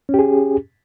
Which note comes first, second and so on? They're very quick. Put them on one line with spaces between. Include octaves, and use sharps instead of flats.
C#4 G4 G#4